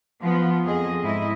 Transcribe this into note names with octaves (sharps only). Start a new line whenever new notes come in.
F3 B3 F4
F2 G#4 D#5
G#2 E4 D#5